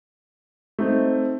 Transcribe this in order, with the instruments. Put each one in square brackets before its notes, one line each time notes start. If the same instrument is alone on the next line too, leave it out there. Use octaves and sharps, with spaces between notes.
[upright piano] A3 C4 D#4